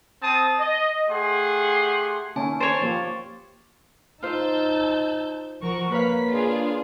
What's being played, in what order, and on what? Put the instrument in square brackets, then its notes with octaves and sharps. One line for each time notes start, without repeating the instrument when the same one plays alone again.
[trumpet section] C4 A5 D#6
D#5
A3 G4 G#4 F#5 C6
[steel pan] D#3 C#4 [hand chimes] A#3 G#5 A5
[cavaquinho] C5 C#5 [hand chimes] A6 D7
[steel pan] F3 A#3 G4 [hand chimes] C#6 A6
[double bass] D#4 [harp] F4 C5 [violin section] A5 E6 G6
[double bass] F3 [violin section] F#4 A#4 C#6
[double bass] A#3 [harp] B4 C#5 F5 [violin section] B6
[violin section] D4 F4 G#4